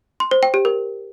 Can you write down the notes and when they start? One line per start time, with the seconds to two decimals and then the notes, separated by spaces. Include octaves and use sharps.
0.20 C6
0.31 C5
0.43 G5
0.54 G4
0.65 A#4